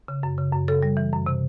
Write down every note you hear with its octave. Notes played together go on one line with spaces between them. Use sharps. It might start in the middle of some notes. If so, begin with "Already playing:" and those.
C#3
F#2
C#3
F#2
C#3 A4
G3
E3
F#2
C3